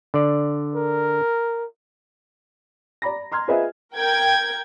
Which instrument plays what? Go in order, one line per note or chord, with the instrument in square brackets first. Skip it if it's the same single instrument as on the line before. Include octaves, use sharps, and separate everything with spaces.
[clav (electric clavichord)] D3 D5
[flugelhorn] A#4
[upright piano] D5 A#5 B5 A#6
A#5 C6 F6 G#6
F4 G#4 B4 C5 D#5 E5
[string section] A#4 G5 G#6